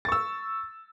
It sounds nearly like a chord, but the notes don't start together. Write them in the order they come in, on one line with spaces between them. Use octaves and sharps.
A6 C#6 E6